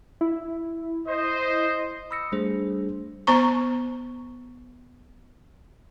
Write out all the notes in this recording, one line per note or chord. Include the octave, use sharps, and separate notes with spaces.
E4
C5 D#5
B5 D#6 E6 A#6 C#7
G3 A3 D4 G#4 C5
B3 C5 A#5 C#6